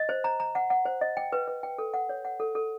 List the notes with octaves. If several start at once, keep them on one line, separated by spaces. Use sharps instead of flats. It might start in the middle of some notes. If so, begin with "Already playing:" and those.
Already playing: D#5
C5
A#5
A#5
F#5
F#5
C5
D#5
G5
B4
B4
G5
A4
F#5
C#5
F#5
A4
A4